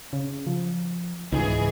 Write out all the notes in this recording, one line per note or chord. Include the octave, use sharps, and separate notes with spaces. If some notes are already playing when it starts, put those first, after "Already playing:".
C#3
F3
C#2 G#2 E3 D#4 G#4